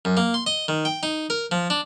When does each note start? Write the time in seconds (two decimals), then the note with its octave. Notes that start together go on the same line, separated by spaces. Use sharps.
0.05 F#2
0.17 A#3
0.34 C6
0.46 D#5
0.68 D#3
0.85 G5
1.03 D#4
1.30 A#4
1.51 F3
1.70 D4